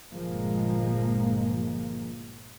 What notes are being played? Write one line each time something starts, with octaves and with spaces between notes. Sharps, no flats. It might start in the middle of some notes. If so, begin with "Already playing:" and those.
G1 A#2 F3 G#3 A#3